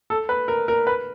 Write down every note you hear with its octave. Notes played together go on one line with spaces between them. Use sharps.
A4
B4
A#4
A#4
B4